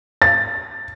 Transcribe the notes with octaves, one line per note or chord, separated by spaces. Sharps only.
A6